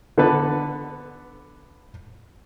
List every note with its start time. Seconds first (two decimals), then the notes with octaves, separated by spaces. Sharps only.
0.18 D3 B3 A4 B4